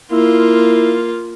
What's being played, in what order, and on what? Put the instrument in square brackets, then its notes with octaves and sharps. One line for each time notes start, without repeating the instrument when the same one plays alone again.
[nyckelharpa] A#3 F4 [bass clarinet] E4